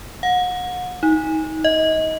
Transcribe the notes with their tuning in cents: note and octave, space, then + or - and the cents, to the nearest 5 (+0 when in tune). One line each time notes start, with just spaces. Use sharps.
F#5 -35
D#4 +25
D#5 +25